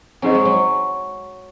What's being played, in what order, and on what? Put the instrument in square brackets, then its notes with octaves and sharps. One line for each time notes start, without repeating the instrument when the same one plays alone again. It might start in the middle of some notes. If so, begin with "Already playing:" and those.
[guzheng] F#3 [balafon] C4 D#4 G#4 C5 D#5
[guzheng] G#3
F#3